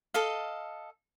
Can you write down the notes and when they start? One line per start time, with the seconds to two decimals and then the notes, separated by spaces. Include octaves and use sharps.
0.14 A4 D#5 F5